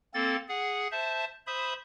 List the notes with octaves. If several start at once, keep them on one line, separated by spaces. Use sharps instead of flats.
A#3 C4 A4 A6
G#4 F#5
C5 E5 A5
C5 E5 B5 D#6